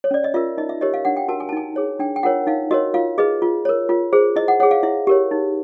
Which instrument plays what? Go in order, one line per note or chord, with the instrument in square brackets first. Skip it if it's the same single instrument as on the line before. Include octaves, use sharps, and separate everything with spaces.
[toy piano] C#5
C#4 D5
D#5
F4 A#4 E5
D#4 D#5
E5
G4 A#4 C#5 D#5
F5
D4 F#5
G5
F#4 A#4 A5
G#5
A5
D#4 G#5
G#4 C#5
D4 G5
G5
F4 A#4 C#5 F#5
D#4 F5
F#4 A#4 C#5 D#5
F4 F5
G#4 B4 D#5
F4
A#4 C#5
F4
G#4 C5
E4 D#5
F#5
G#4 C#5 F#5
F5
E4 E5
G4 A#4 C#5
D#4